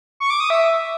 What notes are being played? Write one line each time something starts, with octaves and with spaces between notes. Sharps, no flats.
C#6
D6
D#6
E5